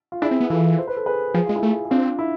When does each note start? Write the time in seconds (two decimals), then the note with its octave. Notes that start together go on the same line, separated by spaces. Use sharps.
0.12 F4
0.22 D4 E4 G#4
0.31 C4
0.40 B3
0.50 E3 F4 A4
0.78 C5
0.87 B4
0.97 A4
1.06 G#4 B4
1.34 F3 G#4
1.46 G#3 F4
1.56 E4 G#4
1.63 A3
1.85 G#4
1.91 C4 D4 F4
2.19 E4